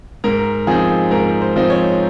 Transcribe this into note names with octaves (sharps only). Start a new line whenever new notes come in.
G#2 A#4
F3 C4 D#4 G#4
G#2 A#4
C5
F3 C4 D#4
C#5